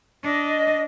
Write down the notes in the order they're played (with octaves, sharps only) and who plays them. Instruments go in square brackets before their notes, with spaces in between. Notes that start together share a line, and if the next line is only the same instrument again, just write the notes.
[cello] D4 [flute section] D#5